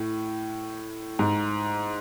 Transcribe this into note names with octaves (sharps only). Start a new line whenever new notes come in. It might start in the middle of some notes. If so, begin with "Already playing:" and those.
Already playing: A2
G#2